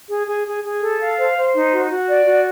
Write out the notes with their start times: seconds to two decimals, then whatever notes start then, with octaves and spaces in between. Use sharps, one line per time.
0.09 G#4
0.27 G#4
0.46 G#4
0.64 G#4
0.81 A4
0.99 F5
1.18 C5
1.36 C5
1.54 D#4
1.72 F#4
1.90 F#4
2.08 D5
2.26 F#4